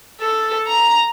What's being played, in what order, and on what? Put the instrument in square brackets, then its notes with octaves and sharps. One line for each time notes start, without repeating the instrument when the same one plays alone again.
[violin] A4
A#5